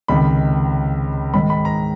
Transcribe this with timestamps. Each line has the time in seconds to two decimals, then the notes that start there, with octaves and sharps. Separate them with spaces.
0.08 C#2 C3 D#3 B5
1.34 G#2 D#3 G#3 B5
1.50 B5
1.65 A#5